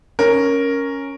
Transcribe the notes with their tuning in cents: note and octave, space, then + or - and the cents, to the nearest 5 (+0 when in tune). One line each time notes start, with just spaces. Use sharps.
C#4 +0 A#4 +0